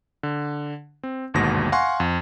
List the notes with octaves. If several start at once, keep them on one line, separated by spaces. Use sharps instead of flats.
D3
C4
G1 D#2 G#2 B2 A#6
F5 F#5 G#5 C6 C#6
F2